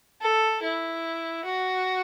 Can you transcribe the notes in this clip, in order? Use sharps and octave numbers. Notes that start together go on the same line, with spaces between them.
A4
E4
F#4